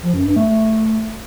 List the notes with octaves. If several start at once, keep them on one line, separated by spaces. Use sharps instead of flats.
F3
F#2
G2
A3
A3